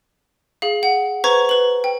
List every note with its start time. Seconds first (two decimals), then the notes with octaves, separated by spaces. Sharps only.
0.62 G#4 F5
0.83 F#5
1.24 B4 C5 A#5 C#6 G#6
1.49 B4 F#7
1.84 G5